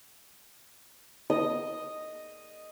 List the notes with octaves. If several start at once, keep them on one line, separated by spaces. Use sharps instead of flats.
D#5